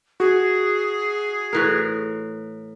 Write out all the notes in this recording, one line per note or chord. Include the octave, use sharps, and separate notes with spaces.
F#4 G#4
A2 E3 A#4